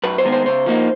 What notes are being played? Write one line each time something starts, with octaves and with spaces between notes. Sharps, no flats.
F#2 B4
C5
D#3 G#3 B3
C5
C#3 C5
F3 A#3 D#4